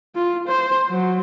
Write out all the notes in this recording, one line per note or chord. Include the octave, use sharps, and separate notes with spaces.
F4
C5
F#3